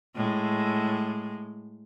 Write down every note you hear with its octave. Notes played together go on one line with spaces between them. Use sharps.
A2 G#3